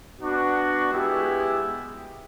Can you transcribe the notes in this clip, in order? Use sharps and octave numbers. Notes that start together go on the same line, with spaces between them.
B3 D4 F#4
G#3 B3 E4 G4